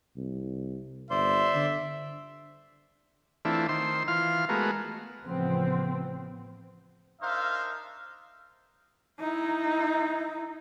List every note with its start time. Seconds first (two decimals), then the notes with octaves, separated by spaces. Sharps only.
0.16 C2
1.10 G1 C5 D5 E5 C6
1.55 D3
3.45 E3 A3 C4 D4 E4 F4
3.69 D#3 C5 C6 E6
4.08 E3 F4 F5 C6 F6
4.49 G#3 A3 B3 F#4 A#4
5.23 A1 C#3 F3 B3 C4
7.22 D4 D#4 A#4 C5 E5 F5
9.20 D#4 E4